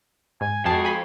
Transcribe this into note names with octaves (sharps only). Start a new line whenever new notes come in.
G#2 G#5
F2 F3 G#3 F#4 G#4 G5 A5 C7
G#5 B5 C6